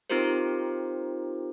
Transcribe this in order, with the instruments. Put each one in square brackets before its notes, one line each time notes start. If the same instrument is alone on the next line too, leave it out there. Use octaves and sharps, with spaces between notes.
[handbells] C4 D#4 F4 G4 A#4 C5